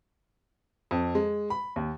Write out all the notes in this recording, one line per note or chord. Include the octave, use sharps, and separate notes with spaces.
F2
G#3
B5
D#2